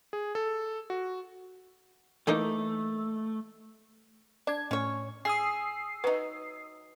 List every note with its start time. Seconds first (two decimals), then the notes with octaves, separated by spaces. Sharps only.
0.13 G#4
0.35 A4
0.90 F#4
2.27 E3 A3 A#3 D#4
4.47 D4 D5 G#6
4.71 A2 C#4 C#5
5.25 G#4 D#6 E6 C7
6.04 F#3 D#4 B4